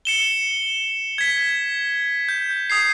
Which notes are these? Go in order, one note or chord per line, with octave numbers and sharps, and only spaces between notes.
C#7 E7 G7
G#6 B6
G6
D#6 G#6 C7